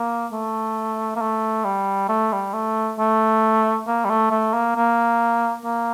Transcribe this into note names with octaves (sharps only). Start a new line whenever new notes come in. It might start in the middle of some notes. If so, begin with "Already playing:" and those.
Already playing: A#3
A3
A#3
A3
G3
A3
G3
A3
A3
A#3
G3
A3
A3
A#3
A#3
A#3